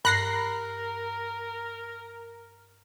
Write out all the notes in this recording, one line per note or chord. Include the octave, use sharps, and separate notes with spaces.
G2 A#4 F#6 A#6 C7